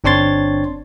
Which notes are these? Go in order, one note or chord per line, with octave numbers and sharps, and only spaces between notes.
G1 C4 D4 C#5 C6 A6